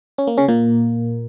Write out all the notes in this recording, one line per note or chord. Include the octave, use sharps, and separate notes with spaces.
C#4
A#3
C#3 C#4
A#2 A#3